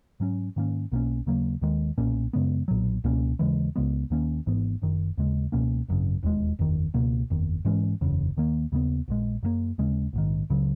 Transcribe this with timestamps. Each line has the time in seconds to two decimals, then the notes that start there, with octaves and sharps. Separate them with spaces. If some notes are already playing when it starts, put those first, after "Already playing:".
0.20 G#2 F#3 C#4
0.56 G#2 D#3 A#3 C#4
0.92 B1 B2 A#3 C#4
1.26 D#2 C#3 F#3 A#3
1.62 D#2 D#3 G#3
1.98 B1 A#2 A#3 C#4
2.33 F#2 C#3 G#3 B3
2.68 B1 A#2 F#3
3.04 C#2 B2 A#3 C#4
3.39 D#2 C#3 E3 G#3
3.76 C#2 C#3 G#3 B3
4.10 D#2 D#3 A#3 C#4
4.46 G#1 G#2 E3 B3
4.82 F#1 F#2 D#3
5.18 D#2 C#3 G#3
5.52 C#2 B2 A#3 C#4
5.88 G#1 F#2 C#3
6.23 E1 D#2 C#3 G#3
6.59 F#1 E2 D#3
6.94 C#2 B2 A#3
7.30 F#1 E2 D#3
7.65 G#2 E3 G#3 C#4
8.01 F#1 E2 C#3
8.37 D#2 D#3 A#3
8.72 D#2 C#3 G#3 B3
9.08 A#1 A#2 G#3
9.43 F#2 E3 A#3
9.78 D#2 C#3 G#3 C#4
10.13 A#1 G#2 D#3
10.50 C#2 C#3 F#3